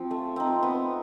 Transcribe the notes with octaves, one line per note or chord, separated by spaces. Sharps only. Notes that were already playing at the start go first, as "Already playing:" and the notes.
Already playing: F3 C4
A3
C4 D#4
B3